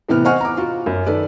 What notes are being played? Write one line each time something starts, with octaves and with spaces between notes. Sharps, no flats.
A2 C3 E3 B3 F6
C5 D#5 F#5 G#5 C#6 F6
A#5 D6
F4 F#4
F#2
D#3 A4 B4 D5